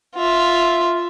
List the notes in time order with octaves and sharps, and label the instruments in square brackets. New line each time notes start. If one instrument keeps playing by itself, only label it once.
[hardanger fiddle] F4 E5